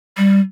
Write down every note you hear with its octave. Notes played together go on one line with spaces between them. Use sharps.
G3